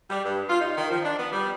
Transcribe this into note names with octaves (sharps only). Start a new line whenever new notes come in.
G3
G2
F4
D#4
D#3
F3
D4
B3
G3